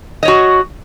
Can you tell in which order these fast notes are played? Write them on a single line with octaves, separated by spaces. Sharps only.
D#5 C#5 F#4